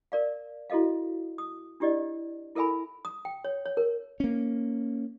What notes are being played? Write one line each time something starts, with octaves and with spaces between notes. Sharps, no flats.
A#4 D5 F5
E4 F#4 A4 D#5 F5
D#6
D4 E4 G4 D5 D#5
E4 A4 A#4 E5 G#5 B5
D#6
G5
C#5
C#5
A#4
A#3 C#4